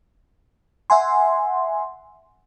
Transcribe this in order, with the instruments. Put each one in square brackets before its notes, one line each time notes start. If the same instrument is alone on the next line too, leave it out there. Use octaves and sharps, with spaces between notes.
[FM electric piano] E5 F#5 G#5 C6